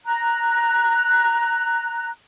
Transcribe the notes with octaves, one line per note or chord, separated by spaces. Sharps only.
A#5 F#6